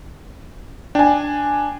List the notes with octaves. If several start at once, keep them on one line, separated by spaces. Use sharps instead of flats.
D4 G5 G#5